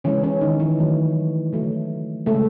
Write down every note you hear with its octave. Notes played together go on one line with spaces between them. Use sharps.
C#3 E3 G#3 C#4
C#4
D#3 D#4
E3 E4
D#3 F#3 A3
C#3 F#3 A3
C#3 G#3 A3 A4